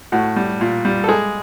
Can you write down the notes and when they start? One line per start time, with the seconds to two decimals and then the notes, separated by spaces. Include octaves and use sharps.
0.12 A2 F#4
0.36 G3
0.61 A#2
0.85 G3
1.04 A4
1.08 G#3 G#4